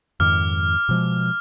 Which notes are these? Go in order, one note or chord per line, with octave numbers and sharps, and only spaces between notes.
F2 G#2 D#3 D6 F6
B2 F3 G#3